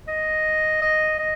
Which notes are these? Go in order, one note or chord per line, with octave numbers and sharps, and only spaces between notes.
D#5
D#5
D#5